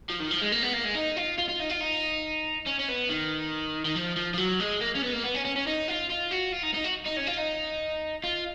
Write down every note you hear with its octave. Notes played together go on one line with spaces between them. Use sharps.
F3
D#3
F3
G#3
A#3
B3
A#3
G#3
D#4
F4
F4
F4
D#4
F4
D#4
C#4
C#4
B3
D#3
D#3
F3
F3
F3
F#3
G#3
A#3
C#4
B3
A#3
B3
C#4
C#4
C#4
D#4
F4
F4
F#4
F4
D#4
D#4
F#4
D#4
C#4
F4
D#4
F4